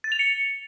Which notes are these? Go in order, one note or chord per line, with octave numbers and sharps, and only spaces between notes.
A6
F7
C#7